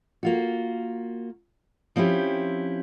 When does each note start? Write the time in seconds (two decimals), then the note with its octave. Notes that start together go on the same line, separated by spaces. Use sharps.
0.23 A#3 F4 F#4
1.96 F3 C4 C#4 E4 G4